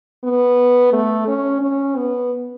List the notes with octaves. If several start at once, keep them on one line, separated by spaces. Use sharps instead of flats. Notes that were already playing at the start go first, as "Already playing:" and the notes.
B3
A3
C#4
C#4
B3